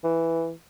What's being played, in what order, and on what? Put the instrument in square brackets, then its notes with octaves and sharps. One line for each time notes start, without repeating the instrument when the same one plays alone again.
[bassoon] E3